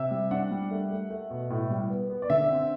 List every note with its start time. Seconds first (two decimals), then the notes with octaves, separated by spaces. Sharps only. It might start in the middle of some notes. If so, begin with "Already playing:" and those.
Already playing: C3 E5
0.11 G3
0.31 D4 F#5
0.51 G3
0.71 A3
0.91 A3
1.10 A3
1.30 B2
1.50 A2
1.70 G3
1.90 B3
2.10 B3
2.22 D5
2.30 D3 E5
2.50 C4